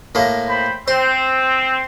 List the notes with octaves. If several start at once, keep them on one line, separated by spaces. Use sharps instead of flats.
A2 A#3
C5 G5 B5
C4 C5